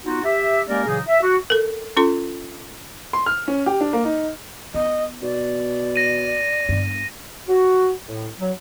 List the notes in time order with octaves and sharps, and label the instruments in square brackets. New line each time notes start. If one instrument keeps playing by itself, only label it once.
[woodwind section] B3 D#4 F4 F#4
G4 E5
G#3 A#3 C#4 G4 A#4 D5
A#2 C#3 E3 F#3 D#4 G#4
E5
F#4
[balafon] A4 A#4
C#4 F4 A4 C6
[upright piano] C6
F6
C#4
G4
D4
A#3
D#4
[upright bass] B3 [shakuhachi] D#5
[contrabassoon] B2 [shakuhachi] D5
[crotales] A#6 D#7
[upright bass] G2 B3
[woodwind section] F#4
A2
F#3